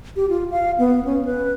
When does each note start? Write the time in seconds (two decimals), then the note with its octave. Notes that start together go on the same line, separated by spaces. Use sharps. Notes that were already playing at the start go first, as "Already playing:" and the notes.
0.16 G4
0.29 F4
0.51 F5
0.78 B3
1.05 C#4
1.25 B4